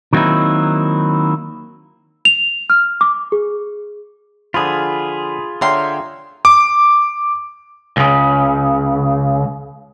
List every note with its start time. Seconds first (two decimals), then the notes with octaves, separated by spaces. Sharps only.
0.13 D#3 F#3 A#3 C4 D#4 E4
2.25 F7
2.70 F6
3.01 D6
3.32 G#4
4.54 D3 F3 F4 G#4 B5 D#6
5.61 D3 C#5 E5 F5 G5 A#5 C6
6.45 D6
7.97 C#2 C#3